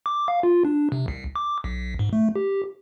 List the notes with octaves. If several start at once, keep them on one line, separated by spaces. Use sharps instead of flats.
D6
F5
F4
D4
C3
C2
D6
B1
G#2
A3
G4